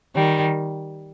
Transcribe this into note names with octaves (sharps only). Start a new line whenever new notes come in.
D#3 G3